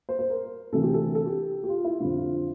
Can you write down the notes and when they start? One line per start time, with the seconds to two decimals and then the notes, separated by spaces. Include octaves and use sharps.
0.09 C5
0.19 C5
0.30 A#4
0.72 D2 C3 E3 A4
0.83 G4
0.94 A4
1.15 A4
1.26 G4
1.64 G4
1.69 F4
1.85 E4
2.00 F2 D3 F4
2.17 F4